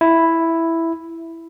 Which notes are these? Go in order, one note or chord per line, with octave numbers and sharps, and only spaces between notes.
E4